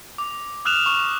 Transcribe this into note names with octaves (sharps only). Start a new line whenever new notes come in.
D6
D#6 F6 F#6 E7 F7
C#6